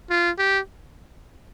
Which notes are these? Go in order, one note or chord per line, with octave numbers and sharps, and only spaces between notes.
F4
G4